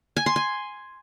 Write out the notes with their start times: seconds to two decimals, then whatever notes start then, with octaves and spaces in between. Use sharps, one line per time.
0.16 G#5
0.26 C6
0.36 G#5